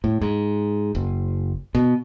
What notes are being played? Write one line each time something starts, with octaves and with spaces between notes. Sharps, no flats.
A2
G#2
F#1
B2